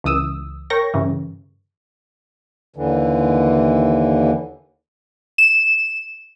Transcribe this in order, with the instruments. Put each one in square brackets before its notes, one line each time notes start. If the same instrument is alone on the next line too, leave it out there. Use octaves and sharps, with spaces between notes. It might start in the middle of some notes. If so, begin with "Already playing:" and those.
[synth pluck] C#2 E3 D#6 E6
A#4 C#5 G5 C#6 A#6
G2 C#3 E3
[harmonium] D#2 D3 E3
[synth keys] E7